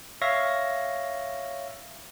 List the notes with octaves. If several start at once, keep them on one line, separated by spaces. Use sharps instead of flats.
C#5 E5 F5 A#6